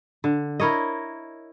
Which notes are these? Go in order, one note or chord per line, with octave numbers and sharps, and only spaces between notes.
D3
E4 A#4 C#5 D#5